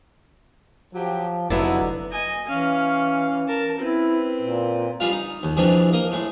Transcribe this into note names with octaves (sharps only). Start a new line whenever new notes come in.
F3 F#3 G4
F1 D3 F#3 B3 D#4 E4
D#5 G#5
E3 C#4 F5
A#4 A5
C4 E4 B4
A#2
G3 G#3 F4
D#4
D#2
F2 C3 E3 G#3 D4
A#3 D#5
A2 G#3